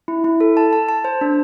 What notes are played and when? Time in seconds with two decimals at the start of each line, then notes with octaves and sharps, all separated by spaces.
0.08 E4
0.24 E4
0.41 A4
0.57 A5
0.73 A5
0.89 A5
1.04 C5
1.21 D4